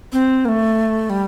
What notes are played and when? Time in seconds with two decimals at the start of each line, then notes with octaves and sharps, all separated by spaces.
0.13 C4
0.45 A#3
0.48 A3
1.10 G3